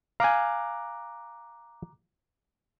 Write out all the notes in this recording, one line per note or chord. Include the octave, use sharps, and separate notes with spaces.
F5 G#5 A#5 D6 F#6